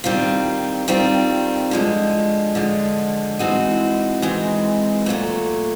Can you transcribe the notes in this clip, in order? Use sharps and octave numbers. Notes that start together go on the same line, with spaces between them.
D#3 G3 C4 F4
D#3 G3 C4 F4
D3 F3 G#3
D3 F3 G#3
E3 G#3 C4 D#4 F#4
E3 G#3 C4 D#4 F#4
A#2 F#3 A3